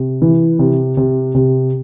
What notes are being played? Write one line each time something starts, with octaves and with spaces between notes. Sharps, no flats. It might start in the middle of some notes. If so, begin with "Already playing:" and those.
Already playing: C3
E3
C3
C3
C3